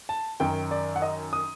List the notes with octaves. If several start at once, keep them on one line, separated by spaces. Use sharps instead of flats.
A5
F#2 D#3 G5
D5
F#5
D#5
D#6